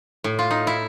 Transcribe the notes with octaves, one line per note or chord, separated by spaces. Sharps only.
A2
F4
D#4
E4